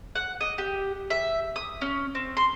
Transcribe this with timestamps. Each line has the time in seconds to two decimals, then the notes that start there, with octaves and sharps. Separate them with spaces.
0.15 F#5
0.41 D#5
0.58 G4
1.10 E5
1.56 D#6
1.82 C#4
2.15 C4
2.37 C6